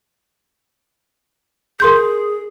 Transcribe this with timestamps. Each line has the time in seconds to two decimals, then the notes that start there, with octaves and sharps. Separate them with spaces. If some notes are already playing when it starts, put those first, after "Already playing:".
1.80 G#4 A#4 C6 G6